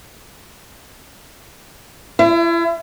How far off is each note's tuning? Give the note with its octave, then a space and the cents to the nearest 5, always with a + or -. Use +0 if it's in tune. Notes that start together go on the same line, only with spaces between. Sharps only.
E4 +40